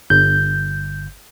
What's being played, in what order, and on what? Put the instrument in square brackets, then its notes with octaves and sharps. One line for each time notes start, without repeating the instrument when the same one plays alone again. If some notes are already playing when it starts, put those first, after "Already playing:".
[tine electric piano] G1 [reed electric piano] G6